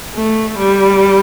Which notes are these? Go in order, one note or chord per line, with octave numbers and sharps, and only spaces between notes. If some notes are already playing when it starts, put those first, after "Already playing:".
A3
G3